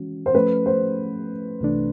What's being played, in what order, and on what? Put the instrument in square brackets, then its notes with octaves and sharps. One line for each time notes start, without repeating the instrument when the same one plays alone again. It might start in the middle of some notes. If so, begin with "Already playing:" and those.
Already playing: [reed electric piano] E3 G#3 C#4 F#4
[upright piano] C5
[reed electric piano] F3 A3 C#4 [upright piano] B4
[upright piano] C5
[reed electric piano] C2 C3 E3 A3 D4